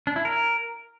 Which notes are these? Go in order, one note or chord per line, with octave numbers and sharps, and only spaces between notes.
D4
E4
A#4